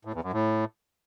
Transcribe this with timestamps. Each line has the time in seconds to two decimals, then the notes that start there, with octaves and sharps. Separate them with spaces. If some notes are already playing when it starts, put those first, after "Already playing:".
0.05 A2
0.14 E2
0.23 F#2
0.33 A2